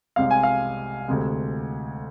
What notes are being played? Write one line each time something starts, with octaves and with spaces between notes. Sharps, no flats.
C2 C3 G#3 F5
G#5
F5
D2 C3 G#3